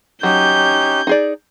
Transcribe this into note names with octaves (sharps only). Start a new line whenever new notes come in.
F#3 C#4 D#4 G4 G6
D#4 G#4 D5